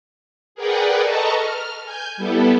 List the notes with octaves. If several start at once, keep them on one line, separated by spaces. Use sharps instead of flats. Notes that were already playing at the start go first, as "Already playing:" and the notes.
G#4 A#4 B4 D5 F#5 G5
A4 B4 D#5 A5 A#5 C#6
F6
G#5 G6
G3 B3 E4 A4